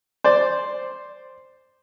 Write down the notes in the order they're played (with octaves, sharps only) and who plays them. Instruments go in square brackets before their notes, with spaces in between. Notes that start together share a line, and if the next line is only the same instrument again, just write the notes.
[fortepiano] C5 D5